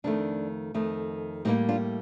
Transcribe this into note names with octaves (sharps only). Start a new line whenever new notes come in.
F2 D#3 A3 D4
F2 D#3 A3
A2 G3 A#3 C4 D#4
D4 F4